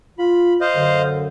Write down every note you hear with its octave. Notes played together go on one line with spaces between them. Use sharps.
F4 B5
C5 D#5 F5
F#2 D3